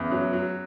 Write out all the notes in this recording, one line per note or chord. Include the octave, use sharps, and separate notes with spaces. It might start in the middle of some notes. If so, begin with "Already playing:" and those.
Already playing: E2 C#3
F#3
F#3